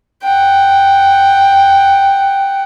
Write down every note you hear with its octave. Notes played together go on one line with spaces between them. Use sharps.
F#5 G5